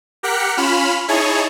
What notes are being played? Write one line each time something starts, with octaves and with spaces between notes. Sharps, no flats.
G4 A#4 F#5 B6 C#7
C#4 F4 B5 F6 E7
D#4 E4 G#4 C#5 A5